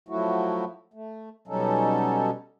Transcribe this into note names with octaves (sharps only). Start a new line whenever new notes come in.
F3 F#3 A3 E4 F#4
A3
B2 F#3 G3 C#4 D#4 A4